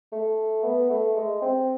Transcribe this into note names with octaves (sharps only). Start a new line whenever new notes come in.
A3
B3
A3
G#3
C4